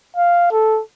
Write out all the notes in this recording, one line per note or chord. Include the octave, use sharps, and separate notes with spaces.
F5
A4